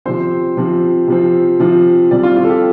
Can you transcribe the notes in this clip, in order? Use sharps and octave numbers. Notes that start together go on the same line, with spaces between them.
C3 F3 C4 C5
C3 F3 C4
C3 F3 C4
C3 F3 C4
C3 G3 C4 D5
F4
F4
A4
G4